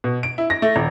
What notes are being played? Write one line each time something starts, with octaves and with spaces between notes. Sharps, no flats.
B2
D7
E4
A#6
A3
D#1